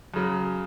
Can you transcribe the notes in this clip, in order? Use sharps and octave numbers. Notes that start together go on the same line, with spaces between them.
F#2 C#3 F#3